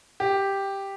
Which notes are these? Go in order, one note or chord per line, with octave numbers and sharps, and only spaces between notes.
G4